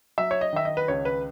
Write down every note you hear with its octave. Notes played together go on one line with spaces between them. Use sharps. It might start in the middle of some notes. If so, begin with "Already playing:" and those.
F#3 E5
C#5
D#5
D#3 E5
D#5
B4
C#2 C#5
B4